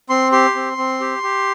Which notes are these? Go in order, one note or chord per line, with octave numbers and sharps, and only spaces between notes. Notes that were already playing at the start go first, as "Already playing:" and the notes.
C4 C6
G4 C6
C4
C4
G4
G4